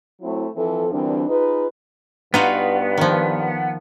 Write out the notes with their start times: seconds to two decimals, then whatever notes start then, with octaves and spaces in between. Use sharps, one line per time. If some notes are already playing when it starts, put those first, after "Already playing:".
0.21 F#3 A3 C4 E4
0.55 E3 F3 C4 A4
0.91 D2 E3 G3 C4 D4 A#4
1.28 D#4 F4 G#4 B4
2.34 G2 B3 D#4 F4 F#4
2.98 D#3 F3